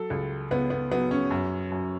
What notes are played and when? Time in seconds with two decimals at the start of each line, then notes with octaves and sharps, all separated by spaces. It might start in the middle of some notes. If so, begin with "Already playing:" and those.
Already playing: F#3 A4
0.10 C#2
0.51 C#2 B3
0.70 B3
0.91 F#3 B3
1.11 C#4
1.31 F#2
1.72 F#2